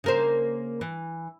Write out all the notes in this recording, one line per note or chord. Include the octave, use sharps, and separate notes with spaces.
C#3 A#3 C5
E3